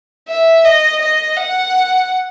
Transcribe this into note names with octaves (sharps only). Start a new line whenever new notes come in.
E5
D#5
D#5
F#5